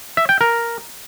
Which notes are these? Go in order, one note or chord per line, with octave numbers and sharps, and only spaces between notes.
E5
G5
A#4